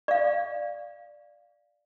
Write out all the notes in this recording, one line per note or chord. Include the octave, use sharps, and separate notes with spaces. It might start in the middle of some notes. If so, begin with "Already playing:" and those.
D5 F5